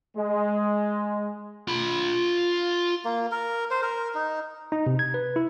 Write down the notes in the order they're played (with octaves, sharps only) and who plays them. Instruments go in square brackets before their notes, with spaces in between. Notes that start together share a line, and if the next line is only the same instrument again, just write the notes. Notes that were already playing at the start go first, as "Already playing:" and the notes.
[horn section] G#3
[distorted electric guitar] F4 B5
[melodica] A#3
A#4
C5
A#4
D#4
[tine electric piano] D#4
C3
G#6
B4
E4